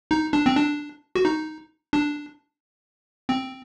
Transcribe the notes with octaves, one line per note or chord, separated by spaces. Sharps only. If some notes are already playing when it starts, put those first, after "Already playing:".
D#4
D4
C4
D4
F#4
D#4
D4
C4